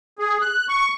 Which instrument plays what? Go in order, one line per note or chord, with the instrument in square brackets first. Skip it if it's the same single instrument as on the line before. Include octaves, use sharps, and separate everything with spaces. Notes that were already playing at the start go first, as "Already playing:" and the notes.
[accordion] G#4
F#6
C#6